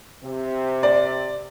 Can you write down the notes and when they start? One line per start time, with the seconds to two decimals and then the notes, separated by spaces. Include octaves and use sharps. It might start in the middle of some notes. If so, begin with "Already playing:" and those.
0.23 C3
0.83 D5